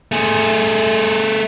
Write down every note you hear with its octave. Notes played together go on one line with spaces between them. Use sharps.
A3 G#4